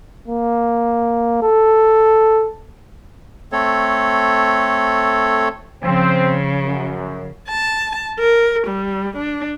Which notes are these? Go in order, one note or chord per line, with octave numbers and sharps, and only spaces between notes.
A#3
A4
A3 C4 A4 C#5
C#3 F3 C4
F#2
A5
A#4
G3
D4